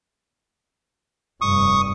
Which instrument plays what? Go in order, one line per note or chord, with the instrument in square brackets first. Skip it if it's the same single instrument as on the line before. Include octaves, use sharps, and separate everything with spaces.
[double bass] F1 G2 [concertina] C#6 D#6